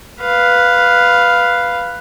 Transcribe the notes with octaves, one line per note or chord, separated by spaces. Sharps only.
B4 F5